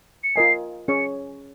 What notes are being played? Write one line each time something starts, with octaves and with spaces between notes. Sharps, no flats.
C#7
F4 A#4 D#5 G#5 C7
C#4 G#4 C#5 C#7